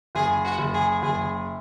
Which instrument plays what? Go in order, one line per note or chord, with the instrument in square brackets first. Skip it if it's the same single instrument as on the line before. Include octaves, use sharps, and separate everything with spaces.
[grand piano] F#1 [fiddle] G#4
[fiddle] F#4
[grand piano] F#1
[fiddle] G#4
[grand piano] F#1 [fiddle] G#4